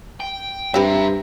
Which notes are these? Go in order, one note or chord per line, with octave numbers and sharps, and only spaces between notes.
G5
G2 C4 G4 B4 E5 A#5